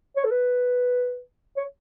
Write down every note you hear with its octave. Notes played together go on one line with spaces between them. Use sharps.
C#5
A4
B4
C#5